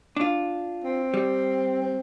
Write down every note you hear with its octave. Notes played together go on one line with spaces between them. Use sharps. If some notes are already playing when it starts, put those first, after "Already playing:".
D4 F4
C4
G3
C4